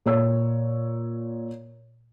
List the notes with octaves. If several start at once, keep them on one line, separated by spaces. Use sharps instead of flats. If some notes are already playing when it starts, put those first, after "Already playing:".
A#2 C#5 E6